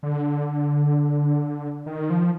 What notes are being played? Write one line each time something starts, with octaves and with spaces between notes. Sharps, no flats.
D3
D#3
F3